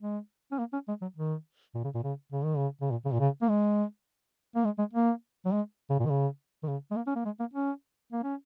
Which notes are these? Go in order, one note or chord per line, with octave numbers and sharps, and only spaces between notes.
G#3
C#4
A#3
C#4
G#3
F#3
D#3
A#2
C#3
A#2
C#3
C#3
D#3
C#3
C#3
A#2
C#3
A#2
C#3
A#3
G#3
A#3
G#3
G#3
A#3
F#3
G#3
C#3
A#2
D#3
C#3
D#3
C#3
G#3
A#3
C#4
A#3
G#3
A#3
C#4
A#3
C#4